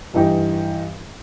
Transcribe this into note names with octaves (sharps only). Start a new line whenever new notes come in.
G2 E3 D#4 G4